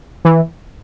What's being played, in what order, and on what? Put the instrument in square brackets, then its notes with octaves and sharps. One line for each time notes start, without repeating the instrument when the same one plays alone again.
[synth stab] E3